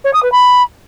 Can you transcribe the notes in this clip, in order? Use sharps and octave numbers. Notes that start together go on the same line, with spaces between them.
C#5
D#6
B4
B5